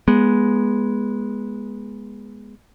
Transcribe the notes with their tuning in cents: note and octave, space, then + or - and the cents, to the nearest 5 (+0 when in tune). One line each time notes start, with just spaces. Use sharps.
G#3 +0 B3 -20